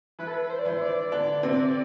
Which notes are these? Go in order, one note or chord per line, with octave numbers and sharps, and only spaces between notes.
E3 E4 B4
A4
B4
C5
D5
E3 E4 C5
D5
D3 D4
C3 C4